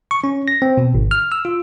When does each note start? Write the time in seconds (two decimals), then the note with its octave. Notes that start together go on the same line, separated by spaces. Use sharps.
0.11 C#6
0.24 C#4
0.48 A#6
0.62 C4
0.77 B2
0.94 G#1
1.11 F6
1.32 E6
1.45 F4